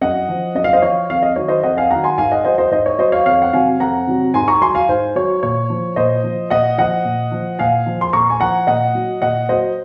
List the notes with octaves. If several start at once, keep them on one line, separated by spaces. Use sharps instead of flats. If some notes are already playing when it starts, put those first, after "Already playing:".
F#2 D#5 F#5
F3
F#2 D#5
F5
C5 D#5
F3 C#5 F5
F2 F5
D#5
D#3 F#3 C#5
C5 D#5
F2 D#5 F#5
F5 G#5
D#3 F#3 F#5 A#5
G#5 C6
G#2 F5 G#5
D#5 F#5
F#3 C5 D#5
C5 D#5
G#2 C5 D#5
C#5
F#3 C5 D#5
C#5 F5
F2 C#5 F5
F#5
C3 F#3 F5 G#5
F2 F#5 A#5
C3 F#3
G#2 G#5 C6
A#5 C#6
F#3 G#5 C6
F5 G#5
G#2 C5
F#3 C#5
A#2 C#5
F3
A#2 C5 D#5
F3
A#2 D#5 F#5
F3 D#5 F#5
A#2
F3
A#2 F5 G#5
F3
C6
A#2 A#5 C#6
G#5
F3 F#5 A#5
A#2 D#5 F#5
F#3
A#2 D#5 F#5
F#3 C5 D#5